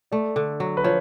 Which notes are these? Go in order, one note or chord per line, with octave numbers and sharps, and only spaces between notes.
A3 D5
D3
F#3
B4
F3 C#5